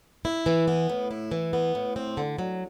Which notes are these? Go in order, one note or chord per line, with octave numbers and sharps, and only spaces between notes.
E4
E3
B3
A2
E4
E3
B3
A2
C4
D3
F#3